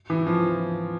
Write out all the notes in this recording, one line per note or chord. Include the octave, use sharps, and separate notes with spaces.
E3
F3